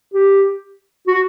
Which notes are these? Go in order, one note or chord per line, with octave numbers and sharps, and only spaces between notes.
G4
F#4